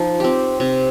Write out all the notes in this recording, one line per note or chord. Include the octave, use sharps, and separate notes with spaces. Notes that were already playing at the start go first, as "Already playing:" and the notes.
Already playing: F3 D#4
C4 G4
C3